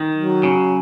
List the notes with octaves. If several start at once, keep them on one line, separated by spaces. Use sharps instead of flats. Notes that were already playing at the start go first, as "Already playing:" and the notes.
Already playing: D#3
F#3
C#3